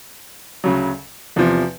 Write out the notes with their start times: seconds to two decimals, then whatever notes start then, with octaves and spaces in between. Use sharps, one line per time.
0.64 D2 C#3 F#3
1.36 E2 C3 F3